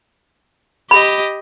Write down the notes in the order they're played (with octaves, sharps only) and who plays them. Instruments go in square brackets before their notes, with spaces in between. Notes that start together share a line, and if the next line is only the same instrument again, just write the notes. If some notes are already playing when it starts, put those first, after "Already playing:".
[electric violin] G4 D#5 [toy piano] B5